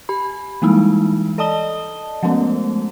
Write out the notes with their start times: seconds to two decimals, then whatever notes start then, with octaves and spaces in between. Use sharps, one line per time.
0.09 G4 B5
0.62 E3 G3 G#3 A#3 D#4 E4
1.38 A4 D5 D#5 A5 D#6 G7
2.23 F3 G#3 A3 B3 C#4